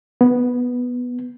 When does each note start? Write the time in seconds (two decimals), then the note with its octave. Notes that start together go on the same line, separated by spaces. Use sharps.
0.21 B3